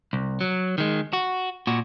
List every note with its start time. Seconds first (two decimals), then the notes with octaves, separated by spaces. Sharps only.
0.13 C2
0.41 F#3
0.78 D#3 G#3
1.13 F#4
1.67 A#2 F#4